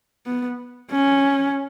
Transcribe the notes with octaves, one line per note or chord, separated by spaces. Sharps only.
B3
C#4